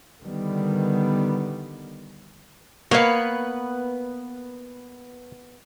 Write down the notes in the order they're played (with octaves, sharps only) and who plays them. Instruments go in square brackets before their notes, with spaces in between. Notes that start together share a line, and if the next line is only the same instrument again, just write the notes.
[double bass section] D3 D#3 G3 B3
[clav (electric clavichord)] A#3 [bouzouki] B3 B4 [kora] C#5 F5